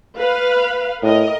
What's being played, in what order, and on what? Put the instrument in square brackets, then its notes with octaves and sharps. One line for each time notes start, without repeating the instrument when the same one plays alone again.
[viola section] B4 F5
[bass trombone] A2 [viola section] A#4 D#5